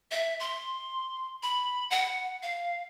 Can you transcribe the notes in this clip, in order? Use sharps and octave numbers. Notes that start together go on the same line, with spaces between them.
E5
C6
B5
F#5
F5